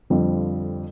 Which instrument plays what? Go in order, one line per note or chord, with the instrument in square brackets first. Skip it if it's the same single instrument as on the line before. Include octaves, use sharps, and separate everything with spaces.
[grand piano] F2 D3 G3 C4 F4